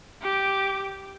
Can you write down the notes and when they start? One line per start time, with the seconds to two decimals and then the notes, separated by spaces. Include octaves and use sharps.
0.22 G4 D6